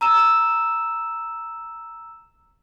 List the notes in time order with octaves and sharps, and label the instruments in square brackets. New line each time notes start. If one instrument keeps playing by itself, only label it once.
[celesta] A#5 E6 E7